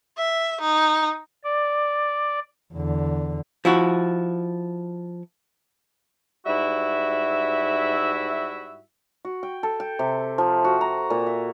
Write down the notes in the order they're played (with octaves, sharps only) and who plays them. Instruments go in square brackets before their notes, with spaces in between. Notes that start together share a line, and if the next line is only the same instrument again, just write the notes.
[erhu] E5
D#4
[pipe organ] D5
[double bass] E2 D3
[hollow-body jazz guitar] F3 E4 F#4
[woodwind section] G#2 G3 E4 F#4 E5
[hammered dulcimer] F#4
G5
A4
G5
C3
F3
F#4
A#5
A#2
E5